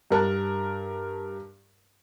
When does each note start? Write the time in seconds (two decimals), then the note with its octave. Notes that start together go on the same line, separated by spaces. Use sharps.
0.11 G2 A#4 A5 F#6